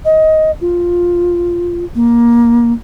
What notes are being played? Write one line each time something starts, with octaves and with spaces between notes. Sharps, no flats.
D#5
F4
A#3